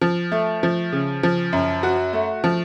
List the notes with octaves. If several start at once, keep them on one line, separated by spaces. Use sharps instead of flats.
F3
A3
F3
C#3
F3
F#2
F#4
A3
F3